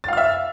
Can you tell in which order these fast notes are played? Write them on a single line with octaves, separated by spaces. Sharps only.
A6 F5 F6 E5